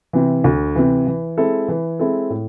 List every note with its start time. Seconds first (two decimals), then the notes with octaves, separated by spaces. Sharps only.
0.13 C3 E3
0.44 D2
0.75 C3 E3
1.07 E3
1.37 G#3 C4 E4 A4
1.68 E3
1.99 G#3 C4 E4 A4
2.30 A2